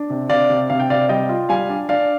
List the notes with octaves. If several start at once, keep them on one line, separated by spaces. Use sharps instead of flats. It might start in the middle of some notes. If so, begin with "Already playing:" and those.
Already playing: D4
C3
C3 D5 F5
C3
C3 F5
G5
C3 D5 F5
G3 D#5 G5
F4
G3 F5 G#5
D4
D4 D5 F5